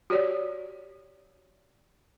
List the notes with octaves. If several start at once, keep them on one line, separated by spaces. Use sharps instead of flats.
F#4 G4 C#5 D5